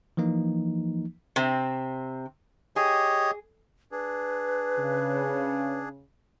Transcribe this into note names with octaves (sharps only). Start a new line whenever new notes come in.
E3 F3 A#3 D#4
C3 C4
G4 G#4 C#5 D#5
D4 G#4 B4
C#3